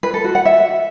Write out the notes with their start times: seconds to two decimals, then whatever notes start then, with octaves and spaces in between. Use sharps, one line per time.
0.03 B4
0.14 A4
0.24 F#4
0.35 F#5
0.45 E5